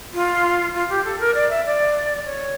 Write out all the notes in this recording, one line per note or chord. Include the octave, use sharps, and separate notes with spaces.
F4
F4
G4
A4
A#4
D5
E5
D5
C#5